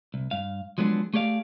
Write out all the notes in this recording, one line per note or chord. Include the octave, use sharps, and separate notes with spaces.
C2
G2 F5
F3 F#3 G#3 B3 D4
A3 G4 G#4 D5 F5